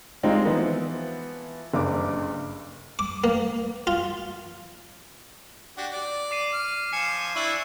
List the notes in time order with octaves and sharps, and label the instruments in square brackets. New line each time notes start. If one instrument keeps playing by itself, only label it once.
[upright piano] G3 G#3 C4 D#4 F4
E3 F3 B3
F#1 G2 D6
[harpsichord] D6
A#3
F4
[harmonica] D4 F#4 G4
D5
[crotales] D6 C7 D#7
[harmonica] F6
[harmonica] F3 G#5 [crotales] C7 C#7 E7
[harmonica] D4 E4 [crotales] C#6 D#7 F#7